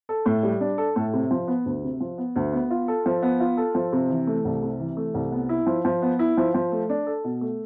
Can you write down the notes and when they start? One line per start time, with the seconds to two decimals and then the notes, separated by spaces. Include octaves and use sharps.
0.09 A4
0.26 A2
0.43 G3
0.61 D4
0.78 A4
0.96 A2
1.13 C3
1.31 F3
1.48 B3
1.66 D2
1.83 C3
2.00 F3
2.18 B3
2.36 D2
2.53 B3
2.70 F4
2.88 A4
3.06 F3
3.22 B3
3.40 F4
3.57 A4
3.75 F3
3.92 C3
4.10 E3
4.27 A3
4.45 C2
4.63 C3
4.80 E3
4.97 A3
5.14 C2
5.32 B3
5.49 E4
5.66 F3
5.85 F3
6.02 B3
6.19 E4
6.37 F3
6.54 F3
6.72 A3
6.89 D4
7.07 A4
7.24 B2
7.41 A3